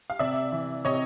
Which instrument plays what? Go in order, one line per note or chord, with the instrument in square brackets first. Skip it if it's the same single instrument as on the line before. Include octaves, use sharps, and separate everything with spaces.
[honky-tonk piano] F5
[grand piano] C3 [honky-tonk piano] D5 E5
[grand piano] E3
[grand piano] C3 [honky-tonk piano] C#5 D#5